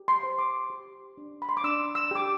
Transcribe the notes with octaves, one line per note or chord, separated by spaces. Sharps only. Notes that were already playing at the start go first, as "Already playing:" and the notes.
Already playing: G4
C6
C5
D6
G4
D4
B5
C6
D6
D4 E6
E6
G4 D6